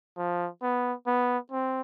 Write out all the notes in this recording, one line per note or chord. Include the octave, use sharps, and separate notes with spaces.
F3
B3
B3
C4